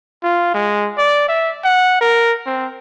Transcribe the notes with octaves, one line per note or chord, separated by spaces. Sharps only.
F4
G#3
D5
E5
F#5
A#4
C4